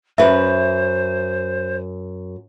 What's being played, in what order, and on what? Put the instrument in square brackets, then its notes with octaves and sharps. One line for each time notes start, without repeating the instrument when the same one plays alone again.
[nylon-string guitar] F#2 B4 [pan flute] C5 [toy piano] E5